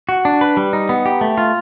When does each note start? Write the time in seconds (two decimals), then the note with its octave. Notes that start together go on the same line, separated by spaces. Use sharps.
0.09 F#4
0.25 D4
0.41 B4
0.57 G3
0.73 D#4
0.89 B3
1.06 G4
1.21 A3
1.38 F4